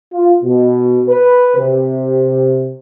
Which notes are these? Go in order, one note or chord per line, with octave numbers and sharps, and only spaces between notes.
F4
B2
B4
C3